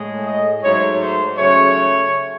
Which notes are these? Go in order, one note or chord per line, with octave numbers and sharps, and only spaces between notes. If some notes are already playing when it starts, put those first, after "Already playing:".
Already playing: A2 G#3
D#5
G#2 F#3 A3 C#5
C5
C#3 F#3 A3 C#5